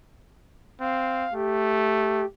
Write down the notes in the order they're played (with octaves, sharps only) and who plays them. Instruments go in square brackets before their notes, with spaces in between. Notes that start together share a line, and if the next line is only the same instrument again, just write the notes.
[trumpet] C4 [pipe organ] F5
[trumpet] A3 [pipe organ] G4